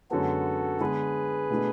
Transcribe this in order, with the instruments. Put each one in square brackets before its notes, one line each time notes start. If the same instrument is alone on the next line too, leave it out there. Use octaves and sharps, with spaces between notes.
[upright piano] F#2 D3 G#3 B3 [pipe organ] F#4 A4
[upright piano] D3 G#3 B3 [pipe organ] G#4 B4
[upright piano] B2 A3 D4